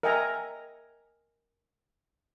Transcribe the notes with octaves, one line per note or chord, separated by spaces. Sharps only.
A#4 D#5 E5 G5 G#5 A#5